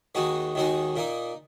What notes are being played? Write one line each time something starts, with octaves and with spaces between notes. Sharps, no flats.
D#2 D#3 G#3 D#4 F#4
D#2 D#3 G#3 D#4 F#4
A#2 A#3 D#4